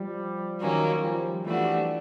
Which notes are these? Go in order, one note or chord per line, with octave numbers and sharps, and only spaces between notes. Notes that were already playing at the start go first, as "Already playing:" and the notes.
Already playing: F3 G3
D#3 F#3 A#3 C#4
F3 G3
E3 F3 G3 A3 D4 F#4